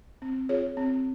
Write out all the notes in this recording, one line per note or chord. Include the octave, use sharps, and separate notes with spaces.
C4
F4 G#4 C#5
C4